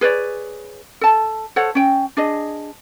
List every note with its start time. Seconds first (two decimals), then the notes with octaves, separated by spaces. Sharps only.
0.01 G#4 B4 C#5 D5
1.01 A4 A5
1.56 A4 C5 C#5 F#5
1.75 C#4 G5
2.17 D4 G#4 D#5